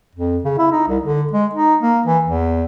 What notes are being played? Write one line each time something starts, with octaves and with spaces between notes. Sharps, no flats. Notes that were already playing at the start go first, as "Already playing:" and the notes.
F2
C#3
E4
D#4
C2
D3
G#3
D#4
A#3
E3
E2